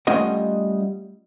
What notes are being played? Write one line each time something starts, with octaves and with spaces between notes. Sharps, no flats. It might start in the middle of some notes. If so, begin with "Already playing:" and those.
G3 A3 C#4 F4 D#5 F#5